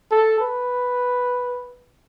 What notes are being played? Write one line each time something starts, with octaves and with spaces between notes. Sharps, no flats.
A4
B4